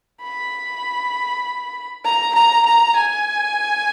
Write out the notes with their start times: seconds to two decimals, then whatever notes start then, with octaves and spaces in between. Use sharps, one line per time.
0.22 B5
2.05 A#5
2.35 A#5
2.66 A#5
2.96 G#5